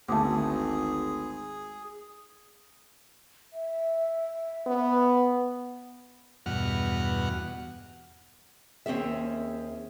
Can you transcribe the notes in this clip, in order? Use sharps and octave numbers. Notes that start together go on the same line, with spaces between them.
G#1 D2 A3 G#4 A5 D6
E5
B3
E2 G2 B2 F#4 F#5 F6
D#2 C4 C#4 G#4 E5